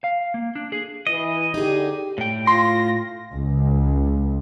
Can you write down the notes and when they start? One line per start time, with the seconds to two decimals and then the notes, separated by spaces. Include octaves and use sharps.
0.04 F5
0.34 A#3
0.55 D4
0.72 G#4
1.07 E3 D#5
1.54 D3 D#4 G4 G#4
2.18 A2 G5
2.47 F4 C6 A#6
3.32 C#2